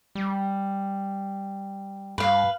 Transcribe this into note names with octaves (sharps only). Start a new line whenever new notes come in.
G3
G2 B4 F5